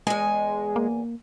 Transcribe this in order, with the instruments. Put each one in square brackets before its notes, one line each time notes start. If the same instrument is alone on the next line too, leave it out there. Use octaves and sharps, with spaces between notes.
[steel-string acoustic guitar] E2 G#5 [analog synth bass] G#3
[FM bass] A#3